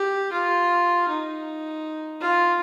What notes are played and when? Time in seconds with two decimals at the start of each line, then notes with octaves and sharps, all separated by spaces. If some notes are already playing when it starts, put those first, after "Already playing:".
Already playing: G4
0.32 F4
1.09 D#4
2.21 F4